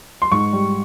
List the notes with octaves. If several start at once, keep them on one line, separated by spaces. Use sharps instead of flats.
C6
G#2 C#6
G3